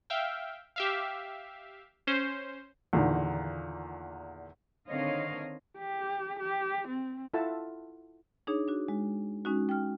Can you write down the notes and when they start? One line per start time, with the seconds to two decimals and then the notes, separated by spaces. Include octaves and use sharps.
0.10 E5 F5 G5
0.76 G4 E5 F5
2.07 C#4 C5
2.93 E2 A#2 D3 D#3
4.89 D3 D#3 C4 C#5 D#5 F5
5.78 G4
6.40 G4
6.88 C4
7.34 E4 F4 A4 E5 F#5 A5
8.47 D4 D#4 G#4 C#5
8.68 D4 F#4
8.88 G#3
9.45 G#3 C#4 D#4 F#4
9.69 G5 F6